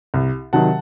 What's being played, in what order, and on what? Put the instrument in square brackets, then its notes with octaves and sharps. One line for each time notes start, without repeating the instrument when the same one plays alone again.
[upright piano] C2
C3 D#3 F#3 F#5 A5